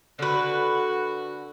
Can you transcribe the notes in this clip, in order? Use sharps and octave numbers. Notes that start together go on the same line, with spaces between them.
D3 F#4 B4